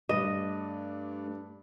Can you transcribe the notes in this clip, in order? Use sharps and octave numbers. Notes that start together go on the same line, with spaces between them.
G2 A3 D4 D#5